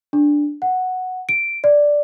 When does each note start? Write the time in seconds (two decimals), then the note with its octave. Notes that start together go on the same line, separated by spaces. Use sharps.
0.13 D4
0.62 F#5
1.29 D7
1.64 D5